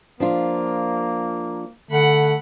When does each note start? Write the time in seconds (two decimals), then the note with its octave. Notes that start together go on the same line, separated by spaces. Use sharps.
0.20 F3 A#3 D4 F4
1.91 D3 A3 F#5 B5